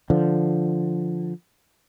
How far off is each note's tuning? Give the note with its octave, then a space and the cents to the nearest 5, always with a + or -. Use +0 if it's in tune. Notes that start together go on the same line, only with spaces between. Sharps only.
D3 +0 F3 -5